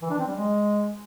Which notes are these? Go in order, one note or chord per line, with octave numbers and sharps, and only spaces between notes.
E3
D4
C4
G3
G#3